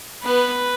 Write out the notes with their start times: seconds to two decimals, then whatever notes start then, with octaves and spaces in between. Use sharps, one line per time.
0.24 B3 B4